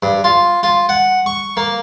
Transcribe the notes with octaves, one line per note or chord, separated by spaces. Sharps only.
G2
F4
F4
F#5
C#6
A#3